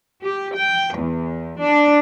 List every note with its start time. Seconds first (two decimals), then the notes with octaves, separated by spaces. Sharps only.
0.23 G4
0.55 G5
0.96 E2
1.60 D4